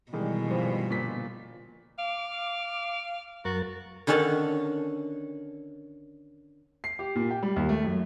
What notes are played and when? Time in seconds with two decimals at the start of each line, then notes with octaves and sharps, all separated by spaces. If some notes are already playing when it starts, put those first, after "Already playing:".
0.13 B2 D#3 E3 G3 G#3
0.48 G2 F3 C5
0.89 G1 A#2 B6
1.98 F5 D6
3.45 F#2 F#4 A#4 A6
4.07 D3 D#3 C#4 D4 A4 A5
6.84 C7
6.99 G4
7.15 A#2
7.31 G5
7.43 G3
7.56 D#2
7.69 A3
7.84 F#2